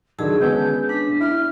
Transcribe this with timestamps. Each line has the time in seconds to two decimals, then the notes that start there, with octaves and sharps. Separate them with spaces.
0.19 D3 D#3 F#3 G#4 A5 E6
0.40 G#3 B3 C#4 G6
0.89 D4 B6
1.20 E4 F6